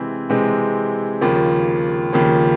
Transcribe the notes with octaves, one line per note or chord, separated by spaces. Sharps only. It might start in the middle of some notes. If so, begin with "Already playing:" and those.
Already playing: C3 E3 G#3 C4
C3 E3 G#3 C4
D#2 C#3 F3 A#3
D#2 C#3 F3 A#3